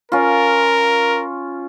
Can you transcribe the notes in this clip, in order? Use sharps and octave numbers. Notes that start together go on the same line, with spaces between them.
C#4 F4 A#4